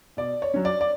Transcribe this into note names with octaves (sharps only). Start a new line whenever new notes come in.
B2 D5
C#5
F#3 C#4
D5
D5